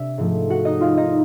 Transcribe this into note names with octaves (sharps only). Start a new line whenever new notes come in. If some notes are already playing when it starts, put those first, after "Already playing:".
Already playing: C3 D4 E5
G#2 F3 A3
F#4 F#5
D#4 D#5
F4 F5
D#4 D#5